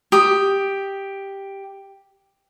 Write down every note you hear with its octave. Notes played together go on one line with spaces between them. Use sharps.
G4 D#6